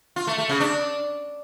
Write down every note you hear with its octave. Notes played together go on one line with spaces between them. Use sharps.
F4
A3
A3
C#3
D4